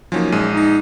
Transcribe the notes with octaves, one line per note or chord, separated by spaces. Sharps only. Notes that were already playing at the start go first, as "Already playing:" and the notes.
F3 F#3 A#3 C#4 D#4
A#1 G#3 D#7
D#4